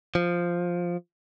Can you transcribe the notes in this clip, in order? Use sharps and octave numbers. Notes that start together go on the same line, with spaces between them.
F3